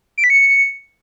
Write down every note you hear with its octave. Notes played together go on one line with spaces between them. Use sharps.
D7
B6
C#7